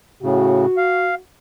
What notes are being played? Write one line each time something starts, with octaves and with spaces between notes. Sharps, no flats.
A2 C#3 F#4
F5